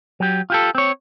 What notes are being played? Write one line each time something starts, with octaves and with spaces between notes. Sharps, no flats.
F#3 G4
F4 G4 A4
C4 C#5